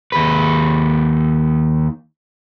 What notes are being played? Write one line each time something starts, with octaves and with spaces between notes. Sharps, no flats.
D#2 B4